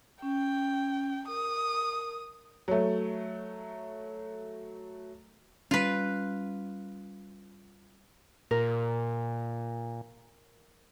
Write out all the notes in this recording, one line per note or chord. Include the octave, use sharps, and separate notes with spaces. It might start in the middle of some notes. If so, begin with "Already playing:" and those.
C#4 G5
A#4 D#6
F#3 A3
G3 C#4 F4 B4
A#2 A#4